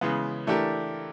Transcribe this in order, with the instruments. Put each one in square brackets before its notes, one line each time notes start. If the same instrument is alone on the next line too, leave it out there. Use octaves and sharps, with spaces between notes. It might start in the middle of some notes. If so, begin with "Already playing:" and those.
[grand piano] C#3 E3 G#3 B3
E3 A3 D4 G4 A#4